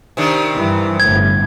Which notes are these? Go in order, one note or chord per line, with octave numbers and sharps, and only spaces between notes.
C3 D#3 D4
G2 E3
G1 A2 G#6